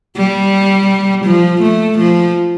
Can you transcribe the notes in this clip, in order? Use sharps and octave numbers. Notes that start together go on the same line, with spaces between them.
G3
F3
A3
F3